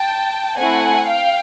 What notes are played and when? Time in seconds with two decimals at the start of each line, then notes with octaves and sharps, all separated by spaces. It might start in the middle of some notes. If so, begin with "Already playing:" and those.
Already playing: G5 A5
0.57 A3 C4 E4 F#5 G#5
1.08 F5 G5